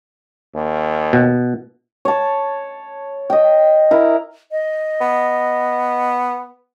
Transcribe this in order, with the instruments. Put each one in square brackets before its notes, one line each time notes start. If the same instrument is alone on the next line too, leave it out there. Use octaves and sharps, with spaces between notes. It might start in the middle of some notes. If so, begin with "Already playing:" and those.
[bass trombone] D#2
[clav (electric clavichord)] B2
[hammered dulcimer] C#5 A5
D#5 G5
E4 A#4
[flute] D#5
[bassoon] B3